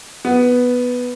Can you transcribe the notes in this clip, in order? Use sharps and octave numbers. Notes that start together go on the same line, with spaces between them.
B3